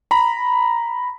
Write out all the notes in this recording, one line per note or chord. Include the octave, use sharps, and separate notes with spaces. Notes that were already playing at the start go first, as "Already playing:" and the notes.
A#5 B5